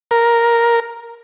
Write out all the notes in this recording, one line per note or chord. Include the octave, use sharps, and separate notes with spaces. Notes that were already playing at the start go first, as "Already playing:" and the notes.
A#4